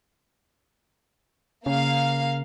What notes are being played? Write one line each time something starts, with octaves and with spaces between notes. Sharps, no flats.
C#3 A#3 F5